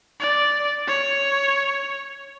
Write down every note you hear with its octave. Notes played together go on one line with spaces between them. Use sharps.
D5
C#5